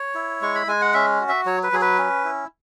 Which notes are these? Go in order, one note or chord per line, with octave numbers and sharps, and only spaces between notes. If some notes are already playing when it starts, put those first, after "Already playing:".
Already playing: C#5
E4
G#3 C#6
B5
G#3 G#5
F#5
C#4 E5
F#4
E5
F#3 C#5
B4
F#3 G#4
B4
C#4
E4